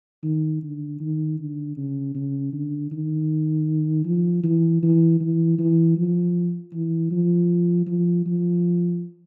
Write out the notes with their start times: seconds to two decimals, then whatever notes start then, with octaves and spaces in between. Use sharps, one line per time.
0.24 D#3
0.63 D3
1.00 D#3
1.39 D3
1.77 C#3
2.15 C#3
2.53 D3
2.91 D#3
4.05 F3
4.44 E3
4.83 E3
5.21 E3
5.58 E3
5.97 F3
6.73 E3
7.11 F3
7.87 F3
8.26 F3